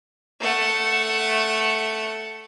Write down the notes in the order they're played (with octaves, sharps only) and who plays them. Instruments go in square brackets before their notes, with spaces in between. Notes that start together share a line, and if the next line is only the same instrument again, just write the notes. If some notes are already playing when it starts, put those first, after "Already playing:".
[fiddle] A3 F#5